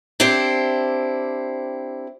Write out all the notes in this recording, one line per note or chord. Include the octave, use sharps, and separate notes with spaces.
C4 D4 E4 G4 C5